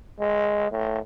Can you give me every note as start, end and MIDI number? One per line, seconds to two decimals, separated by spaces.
0.20 0.67 56
0.71 0.99 45